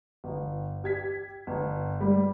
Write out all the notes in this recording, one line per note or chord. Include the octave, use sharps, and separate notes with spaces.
G1
G4 G#6 B6
G1
G3